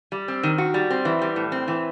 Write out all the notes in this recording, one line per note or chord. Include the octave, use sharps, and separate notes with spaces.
G3
C4
D#3
F#4
G3
C4
E3
G3
A2
C4
E3